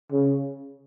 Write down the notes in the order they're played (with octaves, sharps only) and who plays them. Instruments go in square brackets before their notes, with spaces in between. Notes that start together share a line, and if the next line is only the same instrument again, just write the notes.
[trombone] C#3